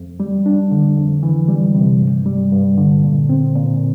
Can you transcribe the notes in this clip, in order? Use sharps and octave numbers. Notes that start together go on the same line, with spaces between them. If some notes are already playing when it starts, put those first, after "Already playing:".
Already playing: F2
G3
D4
D3
F2
E3
G3
C3
G2
G3
G2
D3
A#2
C4
A#2